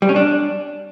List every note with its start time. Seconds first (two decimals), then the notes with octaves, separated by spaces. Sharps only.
0.02 G3
0.09 C#4
0.16 D4